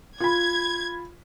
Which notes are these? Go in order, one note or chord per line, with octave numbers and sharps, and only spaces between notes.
F4 B5 G#6